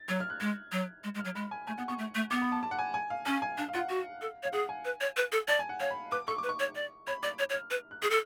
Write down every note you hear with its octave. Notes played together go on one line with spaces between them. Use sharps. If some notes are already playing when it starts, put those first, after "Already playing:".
Already playing: A6
F#3 G#6
F6
F#6
G#3 G#6
F#3
G#3
G#3
F6
F#3
G#3 B5
G#5
A3 G#5
B3 F#5
B3 C#6
A3
A3
B3 D6
B5
A5
A5
F#5
G#5
G#5
F5
C#4 G#5
G#5
D4 F5
F5
F4 F#5
F5
F#4
A4
C#5 F5
G#4 F#5
G#5
B4
C#5
B4
A4
D5 A5
G#5
F#5
C#5 F5
B5
B4 D6
A4 C#6
D6
B4
C#6
C#5
D5
C#5 B5
D5 D6
C#5
C#5
F6
B4
F#6
G#4 F6
A4